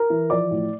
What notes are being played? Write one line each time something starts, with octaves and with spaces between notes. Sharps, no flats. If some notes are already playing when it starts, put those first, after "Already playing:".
Already playing: A#4 A#5
E3
F3 D5 D6
A2